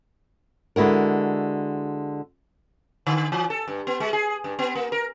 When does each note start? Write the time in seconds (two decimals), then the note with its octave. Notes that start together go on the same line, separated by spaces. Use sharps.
0.76 D3 G#3 E4 F#4 A#4
3.07 D3
3.32 E3
3.50 A4
3.68 G2
3.87 B3
4.00 G#3
4.13 G#4
4.44 G2
4.59 B3
4.75 A#3
4.92 A#4